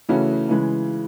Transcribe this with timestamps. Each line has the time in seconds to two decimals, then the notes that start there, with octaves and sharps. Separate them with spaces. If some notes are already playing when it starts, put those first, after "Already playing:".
0.09 C#3 E3 A3 C#4 F#4
0.49 C#3 E3 G#3